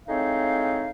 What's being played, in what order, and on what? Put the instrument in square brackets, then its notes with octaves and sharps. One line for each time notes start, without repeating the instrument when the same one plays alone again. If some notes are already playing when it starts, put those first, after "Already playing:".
[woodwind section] A2 G#3 C4 D#4 C#5 F5